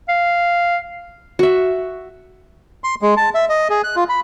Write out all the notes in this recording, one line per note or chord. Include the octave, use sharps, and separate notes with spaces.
F5
F#4 E5
C6
G#3
A5
E5
D#5
G#4
F#6
F4
B5